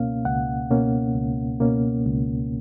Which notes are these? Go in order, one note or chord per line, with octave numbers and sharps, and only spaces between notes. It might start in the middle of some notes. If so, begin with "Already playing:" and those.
Already playing: C#2 B2 A#3 C#4 F5
C#2 F#5
B2 A#3 C#4
C#2
B2 A#3 C#4
C#2